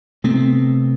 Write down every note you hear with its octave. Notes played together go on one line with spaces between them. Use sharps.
C3 A3 B3 C4